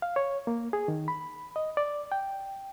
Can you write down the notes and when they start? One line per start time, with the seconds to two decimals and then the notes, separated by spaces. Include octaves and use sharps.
0.02 F5
0.16 C#5
0.47 A#3
0.73 G#4
0.88 D#3
1.08 B5
1.56 D#5
1.77 D5
2.12 G5